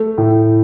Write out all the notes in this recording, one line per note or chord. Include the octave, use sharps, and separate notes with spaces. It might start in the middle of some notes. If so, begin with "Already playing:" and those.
Already playing: A3
A2